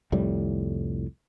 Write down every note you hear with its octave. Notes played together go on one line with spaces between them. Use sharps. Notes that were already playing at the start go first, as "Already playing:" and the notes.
C2 F2 A2 G3